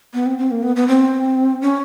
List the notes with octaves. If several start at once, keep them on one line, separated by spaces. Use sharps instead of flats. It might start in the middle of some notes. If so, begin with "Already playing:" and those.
B3
C4
C4
A#3
B3
B3
C4
C#4